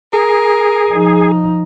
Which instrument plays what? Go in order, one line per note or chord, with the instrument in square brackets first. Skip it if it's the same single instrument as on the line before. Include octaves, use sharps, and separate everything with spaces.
[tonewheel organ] G#4 [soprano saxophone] A#4
[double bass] F3 D#4